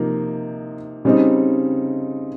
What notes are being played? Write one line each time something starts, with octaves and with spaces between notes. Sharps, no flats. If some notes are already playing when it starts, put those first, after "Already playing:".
Already playing: C3 F3 A#3 D#4
C#3 G3 C4 D#4